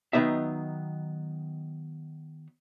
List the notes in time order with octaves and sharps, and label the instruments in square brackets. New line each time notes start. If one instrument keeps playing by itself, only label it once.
[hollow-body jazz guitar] D#3 F#3 B3 D#4 E5